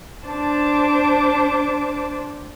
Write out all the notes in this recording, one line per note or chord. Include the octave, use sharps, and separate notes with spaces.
D4 C5 A5 D6